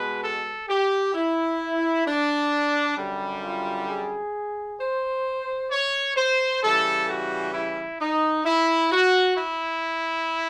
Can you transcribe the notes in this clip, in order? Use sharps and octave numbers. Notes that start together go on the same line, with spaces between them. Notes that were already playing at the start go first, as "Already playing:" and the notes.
Already playing: B2 G#3 B4
A4
G4
E4
D4
F#2 D3 G3
F4
G#4
C5
C#5
C5
C#3 E3 G3 A4
F#4
E4
D#4
E4
F#4
E4